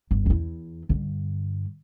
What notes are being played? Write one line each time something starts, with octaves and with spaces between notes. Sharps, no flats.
G1
E2 E4
G2 D3